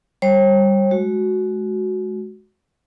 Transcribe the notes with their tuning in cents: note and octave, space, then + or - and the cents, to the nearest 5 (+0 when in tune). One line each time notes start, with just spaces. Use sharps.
G3 +0 C#5 -45
G#3 +30 F#4 +0